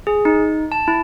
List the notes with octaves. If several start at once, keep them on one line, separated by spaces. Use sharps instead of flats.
G#4
D#4
A5
E4